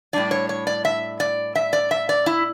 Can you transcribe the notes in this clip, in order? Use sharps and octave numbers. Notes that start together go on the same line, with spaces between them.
A2 G3 D4 D5
C#5
C#5
D5
E5
D5
E5
D5
E5
D5
E4